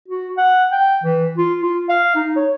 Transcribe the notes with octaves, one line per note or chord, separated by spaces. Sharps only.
F#4
F#5
G5
E3
F4
F4
F5
D#4
C#5